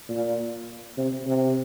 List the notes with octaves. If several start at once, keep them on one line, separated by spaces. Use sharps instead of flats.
A#2
C3
C3